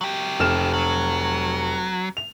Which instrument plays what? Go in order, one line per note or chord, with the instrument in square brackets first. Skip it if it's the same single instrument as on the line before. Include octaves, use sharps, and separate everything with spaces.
[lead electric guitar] F#3 G4
[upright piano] F1 F6 E7
[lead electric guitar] F#3
[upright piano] F7